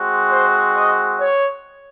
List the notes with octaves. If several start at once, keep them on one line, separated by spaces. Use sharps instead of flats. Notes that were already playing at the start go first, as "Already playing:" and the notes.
Already playing: G#3 C4 F#4
C5
D#5
C#5